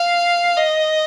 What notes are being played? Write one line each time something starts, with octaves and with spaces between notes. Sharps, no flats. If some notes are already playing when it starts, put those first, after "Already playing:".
Already playing: F5
D#5